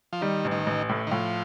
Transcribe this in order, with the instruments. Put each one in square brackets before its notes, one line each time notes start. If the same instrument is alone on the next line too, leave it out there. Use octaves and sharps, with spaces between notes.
[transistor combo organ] F3
[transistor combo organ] D#3 [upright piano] G3
[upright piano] A1
[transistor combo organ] D#3
[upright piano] A1
A2
[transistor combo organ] D#3
[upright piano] A2 [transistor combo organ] F3